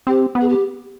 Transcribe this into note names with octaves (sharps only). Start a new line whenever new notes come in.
C4 G4
B3
G#4
G4